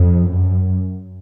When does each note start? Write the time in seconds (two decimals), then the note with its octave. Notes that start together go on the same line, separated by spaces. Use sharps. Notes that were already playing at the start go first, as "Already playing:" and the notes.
Already playing: F2
0.28 F#2